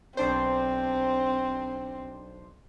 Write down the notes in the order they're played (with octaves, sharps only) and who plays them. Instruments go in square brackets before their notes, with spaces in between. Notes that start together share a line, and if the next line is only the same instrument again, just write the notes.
[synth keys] B1 D4 C5 [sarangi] C4